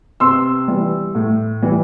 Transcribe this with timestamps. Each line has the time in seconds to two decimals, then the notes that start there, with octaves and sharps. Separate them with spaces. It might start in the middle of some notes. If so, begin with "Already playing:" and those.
0.20 C3 C6 E6
0.68 E3 G3
1.15 A2
1.62 E3 G3